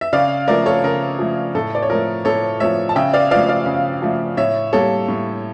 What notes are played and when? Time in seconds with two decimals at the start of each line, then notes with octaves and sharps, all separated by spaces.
0.01 E5
0.13 C#3 D5 F5
0.48 F3 A3 A#4 D5
0.66 A4 C#5
0.84 C#3 A#4
1.19 F3 A3
1.55 A2 A4
1.75 D5
1.82 C#5
1.90 F3 A3 A#4
2.25 A2 A4 C#5
2.60 F3 A3 C#5 E5
2.89 A5
2.96 C#3 E5 G5
3.14 D5 F5
3.31 F3 A3 D5 F5
3.49 D5 F5
3.66 C#3
4.02 F3 A3
4.37 A2 C#5 E5
4.73 G3 A#3 A4 C#5
5.08 A2